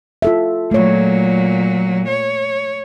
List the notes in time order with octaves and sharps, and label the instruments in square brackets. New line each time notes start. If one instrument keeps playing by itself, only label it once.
[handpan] F4 A4 E5
[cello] A#2 F#3 [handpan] A3 C#5
[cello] C#5